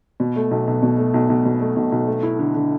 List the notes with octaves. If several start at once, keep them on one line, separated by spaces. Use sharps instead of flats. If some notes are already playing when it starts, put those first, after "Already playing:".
B2
A3
B1
B1
B2
A3
B1
B1
B2
A3
B1
B1
A3
E4
D3
D3